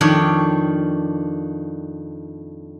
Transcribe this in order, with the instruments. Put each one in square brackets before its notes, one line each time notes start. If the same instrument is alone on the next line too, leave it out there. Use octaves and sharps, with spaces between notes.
[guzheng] F2 D#3 D4 C#5